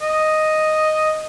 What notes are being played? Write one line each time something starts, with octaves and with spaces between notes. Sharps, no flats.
D#5